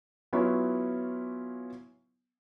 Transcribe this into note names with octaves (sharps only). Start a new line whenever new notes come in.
F#3 B3 C#4 E4 F4